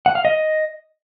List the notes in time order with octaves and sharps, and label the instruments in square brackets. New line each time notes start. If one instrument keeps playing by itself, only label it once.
[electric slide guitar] F#5
F5
D#5